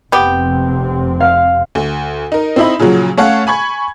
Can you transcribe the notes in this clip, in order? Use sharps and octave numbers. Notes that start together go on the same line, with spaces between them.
F1 C3 B3 C4 G4
F5
D2
D#4 A#4
C4 D#4 E4 D#5 E5 B5
A#2 C#3 F3 F#3
A3 C#4 A4 C#5 F5 F#5
G#5 B5 C#6 G#6